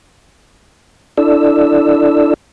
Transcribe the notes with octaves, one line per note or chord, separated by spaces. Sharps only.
D4 E4 A4 D5 E6